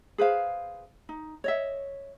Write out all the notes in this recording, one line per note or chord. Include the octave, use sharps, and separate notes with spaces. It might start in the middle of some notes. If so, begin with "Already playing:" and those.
G#4 B4 C5 F5
D#4
C#5 D#5 E5